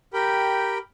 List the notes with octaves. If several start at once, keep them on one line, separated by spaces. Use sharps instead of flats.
G4 A#4 G5 B5